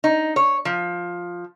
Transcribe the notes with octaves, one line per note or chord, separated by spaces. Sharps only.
D#4
C#5
F3